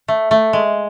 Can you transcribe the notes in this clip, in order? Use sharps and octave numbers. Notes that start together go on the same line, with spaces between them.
A3
A3
G#3